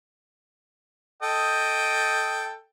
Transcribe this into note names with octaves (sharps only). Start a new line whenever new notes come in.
A4 D#5 G5